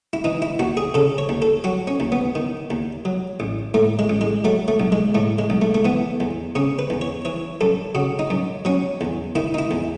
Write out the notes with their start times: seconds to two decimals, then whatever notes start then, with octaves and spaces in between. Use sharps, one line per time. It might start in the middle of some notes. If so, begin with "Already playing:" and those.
0.13 E4
0.24 E3 D#4
0.42 E4
0.59 D#2 F#4
0.77 G#4
0.94 C#3 A4
1.18 C#5
1.29 D#2
1.42 A4
1.64 F#3 F#4
1.87 C#4
2.00 D#2
2.12 B3
2.35 D#3
2.70 D#2
3.05 F#3
3.40 A1
3.74 A2 A3
3.99 G#3
4.09 A1
4.21 G#3
4.44 F#3 A3
4.68 A3
4.80 B1
4.92 G#3
5.15 A2 A3
5.39 G#3
5.50 B1
5.62 A3
5.75 A3
5.85 E3 B3
6.20 E2
6.55 C#3 C#4
6.79 B4
6.90 E2
7.01 C#5
7.25 E3 C#5
7.61 F#2 A4
7.95 C#3 F#4
8.19 D#4
8.30 F#2
8.65 F#3 C#4
9.01 E2
9.35 D#3 E4
9.54 D#4
9.59 E4
9.71 E2